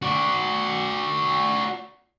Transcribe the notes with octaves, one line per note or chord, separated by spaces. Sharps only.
F#4 D5